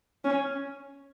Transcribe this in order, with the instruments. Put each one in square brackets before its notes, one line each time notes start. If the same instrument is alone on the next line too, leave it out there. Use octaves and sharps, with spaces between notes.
[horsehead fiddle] C#4